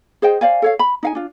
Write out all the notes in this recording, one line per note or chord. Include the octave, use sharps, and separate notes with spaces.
G#4 C5 D#5 G5
C5 D5 F5 G#5
A4 C#5 F5
B5
D#4 F5 G#5
D4 F4